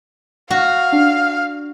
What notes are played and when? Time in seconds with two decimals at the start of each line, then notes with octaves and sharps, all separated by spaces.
0.50 F#4 F5
0.92 D4